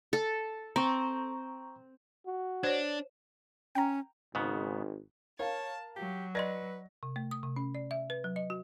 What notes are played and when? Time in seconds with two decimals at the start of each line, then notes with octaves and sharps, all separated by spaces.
0.13 A4
0.76 C4 A#5 C#6
2.26 F#4
2.63 D4 C5 C#5
3.75 C#4 G5 A#5
4.35 G#1 G#2 C#3 B3
5.39 A#4 C#5 F5 A5
5.96 F#3 G4
6.35 B4 D5 D#5 C6 A#6
7.03 C3
7.16 A3
7.31 D#6
7.43 C3
7.56 C#4
7.75 D5
7.91 E5
8.10 B4
8.24 F#3
8.36 D#5
8.50 F#4